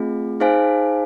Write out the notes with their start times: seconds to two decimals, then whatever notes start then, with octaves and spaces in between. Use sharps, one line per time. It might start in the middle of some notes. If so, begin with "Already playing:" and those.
Already playing: A3 C4 F4 G#4
0.40 D#4 G#4 C5 F5 G#5